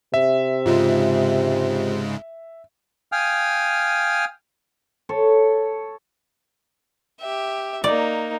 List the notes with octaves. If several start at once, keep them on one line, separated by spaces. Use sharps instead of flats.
C3 E5
G#2 C#3 G#3 F4
F5 G5 G#5 D#6 F6
A4 C#5
G4 E5
A#3 D#4 D5